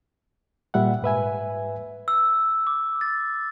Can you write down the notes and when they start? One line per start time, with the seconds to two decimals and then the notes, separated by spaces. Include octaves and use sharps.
0.74 A#2 G3 E5 F#5
1.03 G#2 B4 E5 G#5
2.08 E6
2.67 D6
3.01 A6